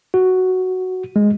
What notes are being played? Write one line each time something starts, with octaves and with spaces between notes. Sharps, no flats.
F#4
G#3